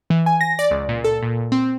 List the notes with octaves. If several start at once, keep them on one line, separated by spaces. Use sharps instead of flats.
E3
G#5
A#6
D5
C#2
A#2
A4
A#2
C4